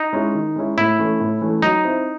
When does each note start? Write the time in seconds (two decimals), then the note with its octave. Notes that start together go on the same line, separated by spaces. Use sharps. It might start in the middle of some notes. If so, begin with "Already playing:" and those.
Already playing: D#4
0.13 G#3 C#4 E4
0.35 D#3
0.56 G#3 C#4 E4
0.77 A2 E4
0.98 E3 A3 C#4
1.20 A2
1.41 E3 A3 C#4
1.62 F#3 D#4
1.85 C4 E4